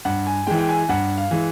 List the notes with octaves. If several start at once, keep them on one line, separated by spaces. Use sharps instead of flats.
G2 F#5
G#5
E3 G#3 G5
G5
G#5
G2 F#5
F5
E3 G#3